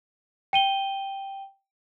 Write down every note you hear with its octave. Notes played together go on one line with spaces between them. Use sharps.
G5 D#7 G7